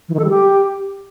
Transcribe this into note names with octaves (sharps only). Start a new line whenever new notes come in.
E3
D#3
A4
G3
G4